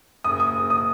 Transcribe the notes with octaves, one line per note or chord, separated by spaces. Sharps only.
F#1 D#6
D#6
F#1
D#6